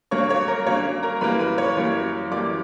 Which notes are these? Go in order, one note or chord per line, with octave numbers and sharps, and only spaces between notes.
G2 F#3 A#3 C#5 C#6
C#5 C#6
A#4 A#5
G2 F#3 A#3 C#4 C#5
A#4 A#5
F#2 E3 G3 A#3 B4 B5
B4 B5
C#5 C#6
F#2 E3 G3 A#3
F#2 E3 G3 A#3 D5 D6